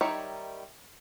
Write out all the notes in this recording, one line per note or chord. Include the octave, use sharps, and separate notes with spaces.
D#3 G3 D#4 C#5 E5